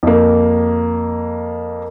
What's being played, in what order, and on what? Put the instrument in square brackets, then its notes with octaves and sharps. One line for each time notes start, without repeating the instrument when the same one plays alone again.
[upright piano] F2 A#3